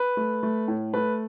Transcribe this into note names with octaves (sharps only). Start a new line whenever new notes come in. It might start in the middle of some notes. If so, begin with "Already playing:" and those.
Already playing: B4
A3
A3
A2
A3 B4